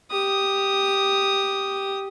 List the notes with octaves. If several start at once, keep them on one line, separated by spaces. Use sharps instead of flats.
G4 D#6